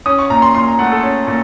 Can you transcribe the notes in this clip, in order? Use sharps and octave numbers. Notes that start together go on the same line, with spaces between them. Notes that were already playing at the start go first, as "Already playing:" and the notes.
C#4 D#6
C#6
A#2 A#5
C6
A#2 C6
A#5
A3 F#5
A4
C#4
A#2